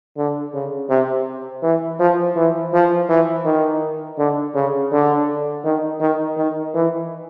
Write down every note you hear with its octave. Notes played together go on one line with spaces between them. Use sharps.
D3
C#3
C3
E3
F3
E3
F3
E3
D#3
D3
C#3
D3
D#3
D#3
D#3
E3